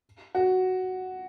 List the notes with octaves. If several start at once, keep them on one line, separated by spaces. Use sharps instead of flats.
F#4